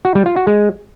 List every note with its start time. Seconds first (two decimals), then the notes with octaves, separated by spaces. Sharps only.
0.05 F#4
0.15 G3
0.26 F4
0.36 F#4
0.47 G#3